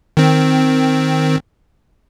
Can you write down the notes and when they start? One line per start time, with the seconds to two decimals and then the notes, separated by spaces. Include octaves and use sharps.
0.17 D#3 C4